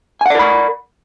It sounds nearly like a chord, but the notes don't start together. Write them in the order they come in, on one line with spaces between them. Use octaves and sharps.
G#5 F#5 D5 A#4 B5